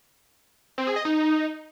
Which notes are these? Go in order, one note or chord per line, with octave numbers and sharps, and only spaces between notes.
C4
G#4
D#5
D#4